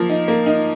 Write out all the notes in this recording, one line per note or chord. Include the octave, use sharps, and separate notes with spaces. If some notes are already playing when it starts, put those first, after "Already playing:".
Already playing: F3 A#3
D#4
A#3
D#4